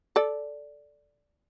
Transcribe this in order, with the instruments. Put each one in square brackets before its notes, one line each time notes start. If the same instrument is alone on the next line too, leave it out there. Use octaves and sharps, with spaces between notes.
[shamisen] A4 D5